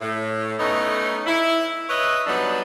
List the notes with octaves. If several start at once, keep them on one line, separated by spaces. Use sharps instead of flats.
A2
A3 B3 C#4 D#4
E4
B4 C#5 D#5 E5
F#3 G3 B3 D4 D#4